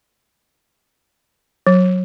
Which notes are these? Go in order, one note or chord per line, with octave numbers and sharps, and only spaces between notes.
F#3